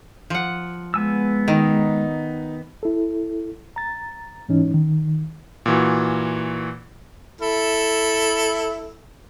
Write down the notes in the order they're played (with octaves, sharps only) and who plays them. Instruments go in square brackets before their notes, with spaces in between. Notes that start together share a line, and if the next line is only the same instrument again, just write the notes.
[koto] F3 F#5
[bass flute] G#3 [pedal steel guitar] B3 G#5 E6
[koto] D#3 [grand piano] D#4
[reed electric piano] E4 A4
A#5 A6
G#2 E3 C#4 D#4
D#3
[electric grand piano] A#2 E3 F#4
[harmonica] E4 A4